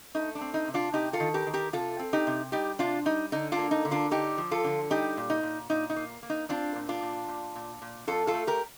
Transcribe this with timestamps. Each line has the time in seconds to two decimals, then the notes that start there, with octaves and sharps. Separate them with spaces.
0.15 A3 D#4
0.35 D4
0.41 C4
0.54 D#4
0.68 C3
0.74 D4 F4
0.93 C3 D#4 G4
1.13 F4 A4
1.20 D#3
1.34 G4 A#4
1.46 D#3
1.54 G4 A#4
1.73 C3 F4 A4
1.99 C4
2.13 D#4 G4
2.27 C3
2.52 G3 D#4 G4
2.79 C3 D4 F4
3.05 G3 D#4
3.32 D3 D#4
3.52 D4 F4
3.58 A#3
3.71 D#4
3.85 D3
3.91 D4 F4
4.11 D3 D#4 G4
4.38 F3
4.51 F4 A4
4.64 D3
4.90 G3 D#4 G4
5.17 A#2
5.30 D#4
5.43 A#2
5.70 A#2 D#4
5.90 D#4
5.96 A#3
6.23 A#3
6.30 D#4
6.49 C4 D4 F4
6.75 A#2
6.89 D4 F4
7.02 A#2
7.28 A#2
7.56 A#2
7.82 A#2
8.07 F2 F4 A4
8.27 F4 A4
8.34 A3
8.47 G4 A#4